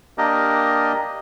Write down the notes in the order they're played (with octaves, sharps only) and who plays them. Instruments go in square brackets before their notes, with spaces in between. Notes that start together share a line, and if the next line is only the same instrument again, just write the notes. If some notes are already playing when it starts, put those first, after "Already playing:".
[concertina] A#3 D4 G4 A#4 D#5